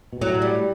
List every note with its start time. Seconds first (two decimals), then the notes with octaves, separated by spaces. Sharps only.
0.13 B2
0.21 A2 F#3
0.42 G3